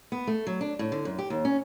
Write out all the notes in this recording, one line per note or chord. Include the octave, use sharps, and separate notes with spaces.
B3
A3
F#3
D4
A2
D3
F#2
G4
D#2
C#4